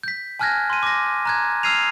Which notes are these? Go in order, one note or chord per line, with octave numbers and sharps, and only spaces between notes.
G6 B6
G#5 A5 F6 F#6 G#6 A#6
C6 D#7
D6 A#6
A#5 F#6 G#6
E6 F6 G#6 C7 D#7 F7